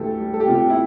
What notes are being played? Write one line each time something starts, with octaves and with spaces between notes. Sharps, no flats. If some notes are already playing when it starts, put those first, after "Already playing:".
Already playing: D2 E3 G4 A4
G3
A4
G4
C3 F4
G4
E4